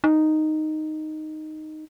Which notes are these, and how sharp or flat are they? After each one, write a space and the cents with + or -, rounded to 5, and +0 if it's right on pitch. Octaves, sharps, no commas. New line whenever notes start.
D#4 -5